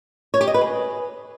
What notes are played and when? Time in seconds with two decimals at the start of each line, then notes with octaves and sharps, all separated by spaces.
0.34 C#5
0.41 G4
0.47 D#5
0.54 B4
0.61 G#4